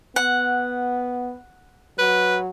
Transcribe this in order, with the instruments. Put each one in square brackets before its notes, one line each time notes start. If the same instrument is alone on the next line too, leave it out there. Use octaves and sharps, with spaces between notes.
[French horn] B3 [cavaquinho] F#5
[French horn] F#3 [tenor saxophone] B4